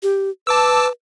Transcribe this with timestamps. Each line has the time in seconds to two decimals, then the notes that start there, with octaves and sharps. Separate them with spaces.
0.03 G4
0.47 B4 A5 D6 E6